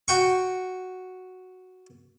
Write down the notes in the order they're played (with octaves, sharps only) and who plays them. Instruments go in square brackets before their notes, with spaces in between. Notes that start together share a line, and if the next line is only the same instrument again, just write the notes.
[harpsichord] F#4 G5 C#6